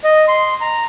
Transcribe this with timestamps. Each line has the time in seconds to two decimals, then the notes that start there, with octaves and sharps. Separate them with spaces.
0.04 D#5
0.28 C6
0.61 A#5